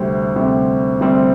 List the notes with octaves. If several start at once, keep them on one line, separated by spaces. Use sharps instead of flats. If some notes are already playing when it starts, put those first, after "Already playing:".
Already playing: D2 C3 G3 C4
D2 C3 G3 C4
D2 C3 G3 C4